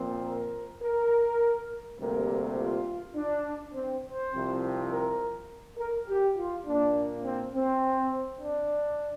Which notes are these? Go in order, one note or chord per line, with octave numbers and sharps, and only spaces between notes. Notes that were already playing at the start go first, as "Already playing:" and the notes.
Already playing: A#2 F3 C4
A#4
A#4
D2 C3 G3 A#3 A#4
F4
D4
C4
C5
C2 C3 F3 C4
A#4
A#4
G4
F4
A#2 A#3 D4
C4
C4
D4